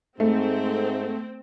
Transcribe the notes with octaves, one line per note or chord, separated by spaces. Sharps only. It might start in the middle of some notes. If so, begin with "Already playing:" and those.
G#2 A3 C4